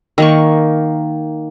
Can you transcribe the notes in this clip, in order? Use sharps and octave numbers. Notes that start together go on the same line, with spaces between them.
D#3 A#3 C#6